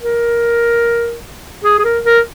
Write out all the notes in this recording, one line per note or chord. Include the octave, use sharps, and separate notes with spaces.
A#4
G#4
G#4
A#4
A#4